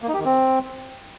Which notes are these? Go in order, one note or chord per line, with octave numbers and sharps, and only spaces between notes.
A#3
D#4
G4
D#3
C4